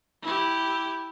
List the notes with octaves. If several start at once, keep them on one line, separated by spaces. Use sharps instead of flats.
E4 G4